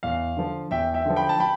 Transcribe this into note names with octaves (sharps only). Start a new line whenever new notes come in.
E2 F5
D3 F3
E2 E5 G5
E5 G5
D3 F3
G5 B5
A5
G5 B5